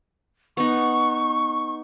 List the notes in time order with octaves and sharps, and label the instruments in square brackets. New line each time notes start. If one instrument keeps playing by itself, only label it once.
[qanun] B3 D#4 [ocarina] C#6